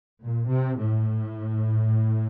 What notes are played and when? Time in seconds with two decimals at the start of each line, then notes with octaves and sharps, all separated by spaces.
0.22 A#2
0.50 C3
0.80 A2